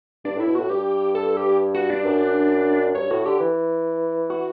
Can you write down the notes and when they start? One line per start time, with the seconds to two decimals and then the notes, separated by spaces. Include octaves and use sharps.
0.25 G2 D4
0.36 A2 E4
0.47 B2
0.55 A2 F#4
0.69 G2 G4
1.15 A4
1.37 G4
1.75 F#4
1.90 D4
2.05 F#2
2.95 G2 C#5
3.10 A2 F#4
3.25 D3 G4
3.40 E3
4.30 F#4